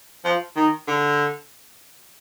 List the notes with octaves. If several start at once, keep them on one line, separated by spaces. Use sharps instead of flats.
F3
D#3
D3